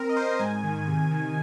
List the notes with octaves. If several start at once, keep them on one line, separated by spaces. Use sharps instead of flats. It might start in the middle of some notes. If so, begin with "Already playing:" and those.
Already playing: C4 A#4
D#5
C4 C5
G#2 G#5
D#3
C3
D#3